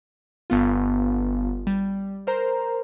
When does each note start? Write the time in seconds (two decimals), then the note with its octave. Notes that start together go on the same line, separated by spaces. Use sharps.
0.50 G1 B3 F4
1.67 G3
2.27 A#4 C5 A#5